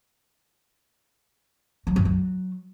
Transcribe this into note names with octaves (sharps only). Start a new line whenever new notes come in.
F#3
F#2
F#3